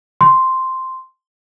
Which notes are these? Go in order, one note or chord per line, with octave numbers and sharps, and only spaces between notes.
C6